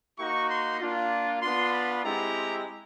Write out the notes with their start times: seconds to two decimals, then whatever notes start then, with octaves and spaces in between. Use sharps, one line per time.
0.18 A#3 D#4 F#4 C#6
0.50 C6
0.80 A#3 D4 F4
1.42 B3 D4 F4 C6
1.72 B5
2.03 G#3 C4 E4 G4 A#5